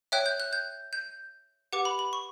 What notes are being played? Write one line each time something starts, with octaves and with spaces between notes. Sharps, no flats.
C#5 E5 G5 F#6
G6
F#6
G6
G6
G4 B4 F#5 D6
B5
B5
C#6